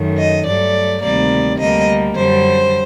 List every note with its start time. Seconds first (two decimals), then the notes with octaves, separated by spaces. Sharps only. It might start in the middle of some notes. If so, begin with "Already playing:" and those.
Already playing: F#2 D#3 A3
0.17 D#5
0.46 G2 F#3 A3 D5
1.02 D2 C3 D#3 G3 A#3 D5
1.59 D2 D3 G3 A#3 D#5
2.16 F#2 D3 G3 C5